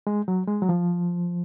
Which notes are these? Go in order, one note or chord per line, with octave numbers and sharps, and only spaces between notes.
G#3
F#3
G#3
F#3
F3